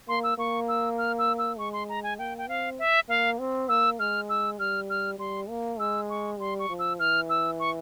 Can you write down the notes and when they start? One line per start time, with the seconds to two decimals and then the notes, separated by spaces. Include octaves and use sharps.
0.08 A#3 C6
0.23 E6
0.38 A#3 C#6
0.68 E6
0.98 F6
1.18 E6
1.38 E6
1.58 G#3 C#6
1.73 C6
1.89 A#5
2.03 G#5
2.19 A#3 G5
2.38 G5
2.48 C4 F5
2.79 E5
3.09 A#3 F5
3.39 C4
3.69 A#3 E6
3.99 G#3 F6
4.29 E6
4.59 G3 F6
4.90 F6
5.19 G3 C6
5.49 A#3
5.79 G#3 E6
6.10 C#6
6.39 G3 C6
6.59 C#6
6.70 F3
6.79 E6
6.99 E3 F6
7.29 E6
7.59 C#6